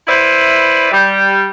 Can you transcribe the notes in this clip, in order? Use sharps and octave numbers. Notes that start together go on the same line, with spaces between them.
E4 B4 C5 D5 E5
G3